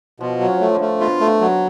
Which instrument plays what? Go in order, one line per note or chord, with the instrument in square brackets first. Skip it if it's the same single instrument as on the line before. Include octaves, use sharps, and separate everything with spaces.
[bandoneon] B2 [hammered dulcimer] F3
[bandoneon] F#3
[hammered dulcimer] C#4
[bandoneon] A3
[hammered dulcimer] F3
D3
[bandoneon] A3
[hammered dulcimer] B2 [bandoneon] F4
[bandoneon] A3
F#3